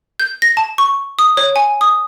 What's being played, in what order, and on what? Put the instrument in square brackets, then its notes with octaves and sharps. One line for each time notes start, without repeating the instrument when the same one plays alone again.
[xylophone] G6
A#6
A5
C#6
D#6
C#5
G#5
D#6